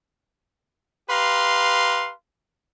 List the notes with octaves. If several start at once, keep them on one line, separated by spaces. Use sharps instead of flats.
G4 B4 F5 A#5 C6